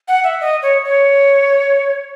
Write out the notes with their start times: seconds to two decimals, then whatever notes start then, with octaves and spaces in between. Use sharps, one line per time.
0.08 F#5
0.24 E5
0.41 D#5
0.62 C#5
0.85 C#5